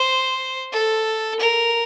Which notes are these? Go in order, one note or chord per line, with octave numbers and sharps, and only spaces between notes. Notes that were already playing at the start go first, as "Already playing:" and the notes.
Already playing: C5
A4
A#4